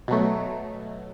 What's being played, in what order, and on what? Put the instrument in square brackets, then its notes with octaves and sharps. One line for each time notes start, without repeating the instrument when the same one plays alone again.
[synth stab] B2 F#3 A3